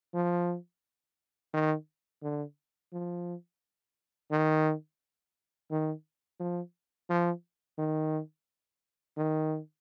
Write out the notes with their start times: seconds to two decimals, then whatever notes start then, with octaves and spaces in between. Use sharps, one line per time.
0.14 F3
1.53 D#3
2.22 D3
2.93 F3
4.31 D#3
5.71 D#3
6.40 F3
7.10 F3
7.78 D#3
9.17 D#3